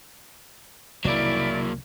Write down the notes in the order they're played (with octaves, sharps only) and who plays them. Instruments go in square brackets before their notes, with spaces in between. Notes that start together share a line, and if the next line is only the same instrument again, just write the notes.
[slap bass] F1 C2 D#3 [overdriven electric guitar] F#3 A#3 [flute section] E4 [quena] D5